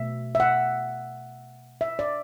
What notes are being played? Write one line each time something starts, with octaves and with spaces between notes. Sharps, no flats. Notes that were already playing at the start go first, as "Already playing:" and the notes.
Already playing: B2 A3 E5
E5
F#5
E5
D5